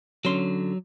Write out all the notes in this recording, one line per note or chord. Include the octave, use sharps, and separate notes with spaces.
D3 F#3 C#4 C6